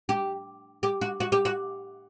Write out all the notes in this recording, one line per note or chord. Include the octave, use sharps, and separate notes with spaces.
G4
G4
F#4
F#4
G4
F#4